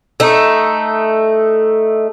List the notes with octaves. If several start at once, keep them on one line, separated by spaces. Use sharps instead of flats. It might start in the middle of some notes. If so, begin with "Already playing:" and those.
A3 D#4